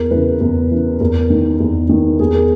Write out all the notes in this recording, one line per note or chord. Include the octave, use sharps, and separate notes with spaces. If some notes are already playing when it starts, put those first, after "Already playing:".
Already playing: E2 A#4
C#3 E3 B4
E2
C#3 E3
E2 A#4
D#3
E2
D#3
E2 G#4
A#4